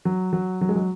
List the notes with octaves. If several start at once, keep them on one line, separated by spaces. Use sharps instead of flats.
F#3
F#3
F#3
G#3
F#3